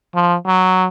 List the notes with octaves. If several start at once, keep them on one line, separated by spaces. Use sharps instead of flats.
F3
F#3